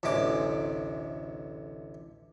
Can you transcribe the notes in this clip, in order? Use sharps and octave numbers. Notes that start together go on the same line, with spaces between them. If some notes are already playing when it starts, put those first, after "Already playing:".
A1 D2 C3 G#3 D6